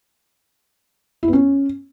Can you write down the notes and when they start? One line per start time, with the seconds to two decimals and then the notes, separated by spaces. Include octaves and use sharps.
1.23 E4
1.28 B3
1.33 C#4